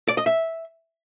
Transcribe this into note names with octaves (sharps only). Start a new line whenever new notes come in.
D5
D#5
E5